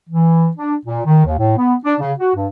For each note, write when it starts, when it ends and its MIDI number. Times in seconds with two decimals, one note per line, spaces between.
0.10 0.49 52
0.57 0.75 62
0.86 1.01 46
1.06 1.25 51
1.26 1.37 39
1.38 1.55 45
1.57 1.74 59
1.85 1.95 62
2.00 2.12 49
2.19 2.34 66
2.36 2.48 43